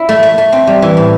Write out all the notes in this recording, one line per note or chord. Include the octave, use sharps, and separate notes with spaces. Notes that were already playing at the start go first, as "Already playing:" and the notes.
Already playing: E4
A3
A3
A3
C4
G3
E3
A2